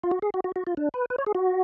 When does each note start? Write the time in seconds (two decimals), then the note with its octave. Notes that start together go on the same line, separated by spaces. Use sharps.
0.04 F4
0.11 F#4
0.22 G#4
0.34 F#4
0.44 F#4
0.56 F#4
0.67 F4
0.77 D4
0.94 B4
1.10 B4
1.18 C#5
1.26 G#4
1.35 F#4